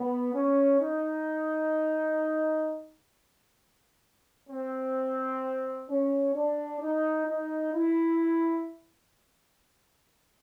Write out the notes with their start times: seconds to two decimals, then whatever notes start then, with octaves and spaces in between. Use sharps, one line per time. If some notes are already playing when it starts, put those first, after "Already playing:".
Already playing: B3
0.34 C#4
0.81 D#4
4.50 C4
5.89 C#4
6.35 D4
6.82 D#4
7.28 D#4
7.74 E4